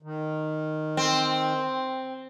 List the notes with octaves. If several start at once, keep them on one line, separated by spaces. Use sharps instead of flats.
D#3
C4